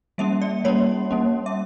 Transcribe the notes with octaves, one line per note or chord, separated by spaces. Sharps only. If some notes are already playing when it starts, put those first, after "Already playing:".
G3 A#3 C#4 E5
D5
G3 A#3 C#4 C#5
G3 A#3 C#4
E5